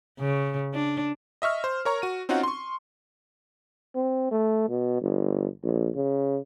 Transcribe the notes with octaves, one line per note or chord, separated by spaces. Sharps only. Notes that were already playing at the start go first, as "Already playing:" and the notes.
C#3
D4
D#5 E5 C#6 F6
C5
A#4 C#5 A#5 C#6
F#4 D#7
C4 C#4 D#4 F4 F#4 F#5
C6 C#6
C4
A3
B2
G1
A#1
C#3